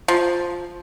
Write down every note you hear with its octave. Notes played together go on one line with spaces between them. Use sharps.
F3